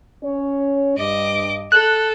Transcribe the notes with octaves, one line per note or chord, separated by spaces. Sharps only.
C#4 C#5
G2 D#5 D6
A4 F#6